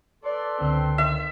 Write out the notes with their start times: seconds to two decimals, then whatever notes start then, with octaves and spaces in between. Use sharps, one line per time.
0.24 A4 B4 D5 C6
0.61 C#2 D3 C4
0.98 D#3 E5